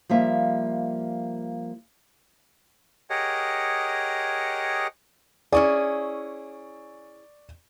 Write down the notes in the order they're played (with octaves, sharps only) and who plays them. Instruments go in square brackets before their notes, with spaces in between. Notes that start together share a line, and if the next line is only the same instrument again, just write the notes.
[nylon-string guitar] F3 G3 A#3 E5
[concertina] G4 G#4 A#4 C#5 D#5 F#5
[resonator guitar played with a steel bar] C#4 E4 G#4 [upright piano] D5 C#6